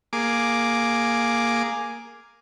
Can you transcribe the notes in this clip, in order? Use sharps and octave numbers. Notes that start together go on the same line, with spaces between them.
A#3 G#4 D6